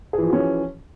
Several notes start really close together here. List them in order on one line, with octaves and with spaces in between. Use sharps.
G#4 E3 F3 F#4 C#4